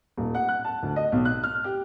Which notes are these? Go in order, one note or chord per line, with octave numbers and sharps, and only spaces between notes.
D#1
F#5
F#6
A5
D2
D#5
B1
F#6
F6
G4